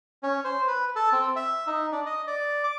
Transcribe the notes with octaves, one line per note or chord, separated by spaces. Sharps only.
C#4
C5
B4
A4
C4
E5
D#4
D4
D#5
D5
D6